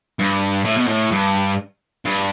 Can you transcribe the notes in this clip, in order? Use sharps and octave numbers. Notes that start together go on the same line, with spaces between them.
G2
A2
B2
A2
G2
G2